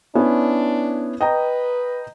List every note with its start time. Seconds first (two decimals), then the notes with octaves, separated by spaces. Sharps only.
0.15 B3 C#4 D4 E4
1.21 B4 D#5 G5 A#5